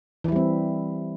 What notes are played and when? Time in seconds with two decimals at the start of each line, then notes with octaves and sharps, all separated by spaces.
0.24 E3
0.28 E4
0.32 G3
0.36 C4